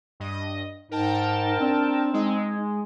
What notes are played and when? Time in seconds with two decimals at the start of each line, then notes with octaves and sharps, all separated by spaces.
0.20 G2 D#5
0.91 G#2 D#4 A#4 G5 A5
1.61 C4 D4
2.14 G#3 D#4